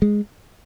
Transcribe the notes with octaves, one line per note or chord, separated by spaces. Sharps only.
G#3